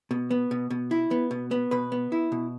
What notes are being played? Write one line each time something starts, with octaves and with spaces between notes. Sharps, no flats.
B2
B3
B2
B2
E4
B3
B2
B3
B2 B4
B3
E4
B2